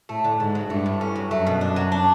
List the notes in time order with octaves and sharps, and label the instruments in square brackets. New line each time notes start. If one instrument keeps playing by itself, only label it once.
[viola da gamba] A2 [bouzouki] A3
[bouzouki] D3
[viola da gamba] G#2 [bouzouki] D3
[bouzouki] F#3
[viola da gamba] G2 [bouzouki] A3
[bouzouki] A2
C#4
F#3
[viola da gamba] F#2 [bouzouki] A3
[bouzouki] B2
D4
F#3
D4